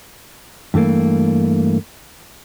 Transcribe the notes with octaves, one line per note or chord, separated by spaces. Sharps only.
G2 E3 A3 A#3